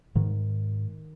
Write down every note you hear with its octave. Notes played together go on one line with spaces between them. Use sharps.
G#2 D#3